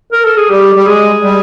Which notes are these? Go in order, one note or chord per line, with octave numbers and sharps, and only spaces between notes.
A#4
A4
G#4
G3 G4
G3
G#3 G#4
G3